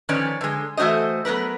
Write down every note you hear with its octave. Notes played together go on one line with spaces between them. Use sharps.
D#3 F3 C#4 B4 C#5 D5
D3 G#3
E3 A3 F#4 C5 D#5
F#3 B3 A#4 B4